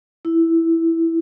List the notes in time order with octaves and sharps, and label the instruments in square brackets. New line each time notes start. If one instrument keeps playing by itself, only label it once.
[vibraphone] E4